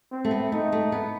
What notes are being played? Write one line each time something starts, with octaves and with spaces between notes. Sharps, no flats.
C4
A3
B3
A3 D#4
A3
B3